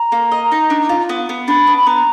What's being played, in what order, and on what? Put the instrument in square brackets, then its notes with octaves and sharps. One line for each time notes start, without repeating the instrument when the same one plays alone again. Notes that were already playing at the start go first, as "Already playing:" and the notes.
Already playing: [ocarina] A#5
[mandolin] A#3
D#5
D#4
D4
F4
B3
B3
[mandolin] D4 [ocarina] B5
[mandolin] B3
[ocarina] B5
[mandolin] B3 [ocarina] A#5